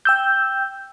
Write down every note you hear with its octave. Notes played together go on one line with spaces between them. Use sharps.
G5 E6 G6